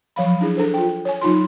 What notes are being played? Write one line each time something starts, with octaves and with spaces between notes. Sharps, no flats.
F3 F#3 F5 B5
D4 E4 G#4
D4 A4 C5
F4 G5
C#5 G#5
F#3 D#4 F4 C6